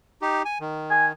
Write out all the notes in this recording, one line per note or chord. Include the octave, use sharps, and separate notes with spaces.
D#4 G4
G#5
D#3
G#5